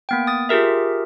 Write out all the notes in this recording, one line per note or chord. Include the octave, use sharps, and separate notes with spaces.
A#3 B3 G5
D#6 A6
F4 G4 G#4 A#4 E5